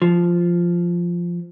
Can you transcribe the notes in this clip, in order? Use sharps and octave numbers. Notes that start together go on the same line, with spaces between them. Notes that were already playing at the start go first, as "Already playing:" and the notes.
F3